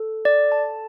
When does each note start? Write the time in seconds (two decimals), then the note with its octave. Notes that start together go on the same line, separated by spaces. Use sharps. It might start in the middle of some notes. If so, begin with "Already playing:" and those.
Already playing: A4
0.25 D5
0.52 A5